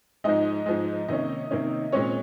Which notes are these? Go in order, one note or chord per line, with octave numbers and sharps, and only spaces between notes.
G#2 F3 G#3 D#4 D#5
G#2 F3 G#3
C3 D#3 A#3 C#4 D#4 D#5
C3 D#3 A#3 C#4
A#2 G#3 C4 C#4 C#5